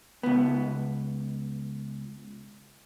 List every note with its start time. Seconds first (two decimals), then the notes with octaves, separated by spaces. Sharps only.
0.23 C#2 B3